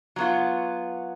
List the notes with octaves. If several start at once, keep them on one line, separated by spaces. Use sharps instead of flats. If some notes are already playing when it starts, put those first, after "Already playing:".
F#3 B3 F4